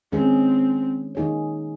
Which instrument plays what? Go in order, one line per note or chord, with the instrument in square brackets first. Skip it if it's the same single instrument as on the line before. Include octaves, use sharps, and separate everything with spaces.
[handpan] D#3 G#3 C#4 G#4 [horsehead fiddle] C4
[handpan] D#3 A#3 D#4 G#4 C#5